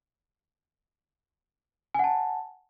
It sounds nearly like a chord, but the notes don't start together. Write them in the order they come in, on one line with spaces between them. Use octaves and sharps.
G#5 F#5 A5